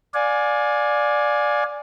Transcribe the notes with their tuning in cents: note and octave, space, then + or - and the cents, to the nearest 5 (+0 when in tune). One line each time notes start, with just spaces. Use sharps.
D5 +0 F5 +35 G#5 +5